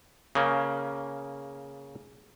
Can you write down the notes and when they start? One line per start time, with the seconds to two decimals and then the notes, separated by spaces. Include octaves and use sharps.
0.35 C#3 A#3 C#4